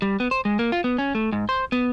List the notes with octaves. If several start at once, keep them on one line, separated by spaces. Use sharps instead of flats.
G3
B3
C5
G#3
A#3
F4
B3
C#4
A3
G#2
C5
B3